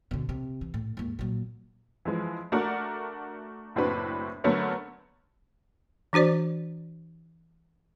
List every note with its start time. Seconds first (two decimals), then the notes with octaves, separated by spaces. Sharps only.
0.11 B2 D3
0.29 C3
0.61 E3
0.74 A2
0.97 D#2 G#2
1.19 A#2 F#3
2.05 E3 F3 G#3
2.52 A3 D4 F#4 A#4 D5 F#5
3.75 F#1 A2 C4 D4 F#4 B4
4.44 D3 F#3 A3 B3 C#4 A#4
6.13 E3 D4 F#4 C5 D5